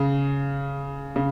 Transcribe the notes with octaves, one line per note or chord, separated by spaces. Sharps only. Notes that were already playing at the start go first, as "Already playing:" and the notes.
Already playing: C#3
C#3